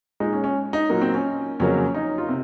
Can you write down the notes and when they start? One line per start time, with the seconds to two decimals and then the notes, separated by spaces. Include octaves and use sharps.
0.20 A#2 G#3 D#4
0.33 C#4
0.44 C#4
0.73 D#4
0.89 A#2 F#3 A#3 D#4
1.01 C4
1.14 C#4
1.60 F2 C#3 F#3 A#3 C#4
1.78 C#4
1.94 D#4
2.18 F4
2.29 C3